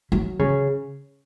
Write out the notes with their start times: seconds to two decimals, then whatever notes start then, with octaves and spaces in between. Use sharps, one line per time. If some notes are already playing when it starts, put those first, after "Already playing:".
0.12 F#3
0.39 C#3